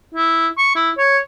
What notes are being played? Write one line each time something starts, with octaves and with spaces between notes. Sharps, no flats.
E4
C#6
E4
C#5